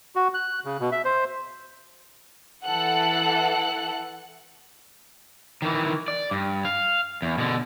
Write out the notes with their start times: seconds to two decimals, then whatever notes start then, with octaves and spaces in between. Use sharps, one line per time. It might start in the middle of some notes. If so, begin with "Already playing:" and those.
0.16 F#4
0.34 F#6
0.65 C#3
0.80 B2
0.92 E5
1.05 C5
2.64 E3 A4 F#5 F#6
5.62 D#3 E3
6.08 D5
6.31 G2
6.65 F5
7.22 E2
7.38 B2 D3